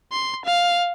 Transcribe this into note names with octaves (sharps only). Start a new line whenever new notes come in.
C6
F5